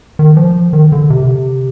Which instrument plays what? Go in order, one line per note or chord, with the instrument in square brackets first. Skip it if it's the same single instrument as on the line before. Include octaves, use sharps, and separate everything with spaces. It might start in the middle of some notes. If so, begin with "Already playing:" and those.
[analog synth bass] D#3
F3
D#3
D3
C3